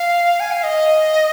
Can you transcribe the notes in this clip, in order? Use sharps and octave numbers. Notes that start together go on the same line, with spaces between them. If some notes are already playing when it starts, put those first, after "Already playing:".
Already playing: F5
G#5
F5
D#5